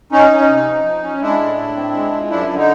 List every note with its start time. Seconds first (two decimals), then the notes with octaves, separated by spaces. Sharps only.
0.12 C#4 D#4
0.31 C#4
0.39 D#4
0.49 C3
0.67 F3
0.85 F3
1.03 C#4
1.21 G#3 D4 E4
1.40 A2
1.57 A2
1.76 C4
1.94 G#3
2.13 F3
2.30 F#2 D4 E4
2.49 D3
2.58 D#4